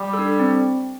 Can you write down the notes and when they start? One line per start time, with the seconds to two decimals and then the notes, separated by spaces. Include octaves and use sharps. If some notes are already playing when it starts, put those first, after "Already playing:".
Already playing: G3
0.13 A4
0.19 D4
0.39 C4